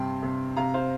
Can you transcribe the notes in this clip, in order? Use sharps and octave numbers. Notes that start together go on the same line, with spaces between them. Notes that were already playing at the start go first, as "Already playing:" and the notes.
Already playing: G2 C3 G5 C6
C3
C3 F5 A#5
C5 F5